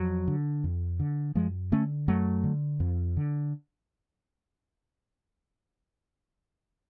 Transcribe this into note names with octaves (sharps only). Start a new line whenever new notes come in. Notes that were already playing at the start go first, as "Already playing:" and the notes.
Already playing: F2 F#3
D3
F2
D3
F#2 F3 G#3
D3 A3 C#4
F#2 F#3 A3
D3
F2
D3